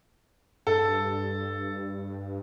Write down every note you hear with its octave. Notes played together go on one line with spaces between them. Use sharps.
G2 A4